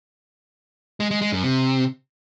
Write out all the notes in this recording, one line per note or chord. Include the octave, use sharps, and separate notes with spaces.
G#3
G#3
G#3
F#2
C3